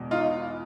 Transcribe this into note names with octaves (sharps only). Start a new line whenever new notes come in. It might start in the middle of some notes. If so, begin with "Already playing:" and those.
Already playing: E2 B2 G#3
D#4 F4